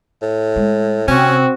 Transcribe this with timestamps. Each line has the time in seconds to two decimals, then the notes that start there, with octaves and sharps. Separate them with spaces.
0.22 A2
0.56 G#3
1.08 C3 C4 C#4 F#4